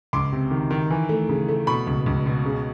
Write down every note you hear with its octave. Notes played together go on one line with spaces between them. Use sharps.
C#2 C6 D6
C3
D#3
D#3
E3
A3
C#3
A3
B2 B5 C#6
C#2
C#2
B2
C#3